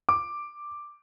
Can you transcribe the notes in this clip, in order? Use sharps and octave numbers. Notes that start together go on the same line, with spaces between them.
D6